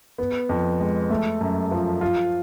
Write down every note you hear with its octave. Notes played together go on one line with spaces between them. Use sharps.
B3
F2
G#3
A3
F#2
F3
F4